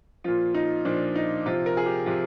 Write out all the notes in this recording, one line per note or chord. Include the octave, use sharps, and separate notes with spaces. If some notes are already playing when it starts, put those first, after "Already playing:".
A#2 F3 F4
D#4
A#2 F3 D4
D#4
C3 F3 F4
A#4
G#4
G4
C3 F3 F4